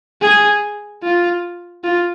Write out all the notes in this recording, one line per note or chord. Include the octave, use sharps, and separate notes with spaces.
G#4
F4
F4